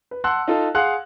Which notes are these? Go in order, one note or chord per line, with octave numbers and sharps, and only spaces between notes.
B4
F#5 A5 C6 E6 F#6
D#4 F4 A4
G#4 F5 F#5 C6 F#6